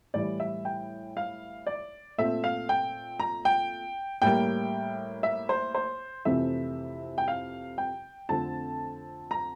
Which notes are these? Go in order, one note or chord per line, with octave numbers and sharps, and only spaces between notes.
A2 E3 G3 D5
E5
G5
F5
D5
A#2 A3 C4 E5
F5
G5
A#5
G5
A2 G3 A#3 G5
E5
C5
C5
F2 C3 E3 A3 C4 E5
G5
F5
G5
F2 D3 A3 C4 A5
A#5